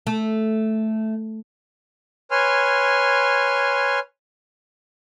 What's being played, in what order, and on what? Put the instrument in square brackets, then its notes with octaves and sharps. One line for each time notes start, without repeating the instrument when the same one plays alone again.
[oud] A3
[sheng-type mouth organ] B4 C#5 G#5 C6 F6